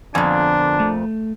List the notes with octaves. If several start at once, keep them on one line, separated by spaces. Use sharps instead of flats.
F2 A#2 D3 B3 D4 G#5
A3